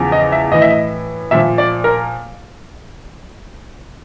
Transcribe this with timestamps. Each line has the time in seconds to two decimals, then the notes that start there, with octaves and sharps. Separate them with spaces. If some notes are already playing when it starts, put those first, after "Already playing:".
Already playing: E2 C#3 F3
0.12 D#5
0.32 E5
0.52 A2 E3 D#5
0.62 E5
0.71 D#5
1.31 A#2 F3 E5
1.58 D5
1.84 A#4